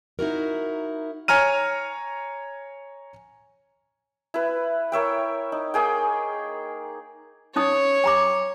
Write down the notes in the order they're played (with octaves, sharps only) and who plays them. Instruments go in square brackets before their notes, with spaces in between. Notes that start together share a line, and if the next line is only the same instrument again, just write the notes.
[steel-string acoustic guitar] D#4 E4 F#4 A#4
[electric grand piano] C#5 G#5 A#5 F6 D#7
[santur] E4 B4
A#4 C#5 E5 G5
D#4
A#3 G#4 G5
[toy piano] C#4 D#4 D#6 [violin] C#5
[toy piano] G5 A#5 D6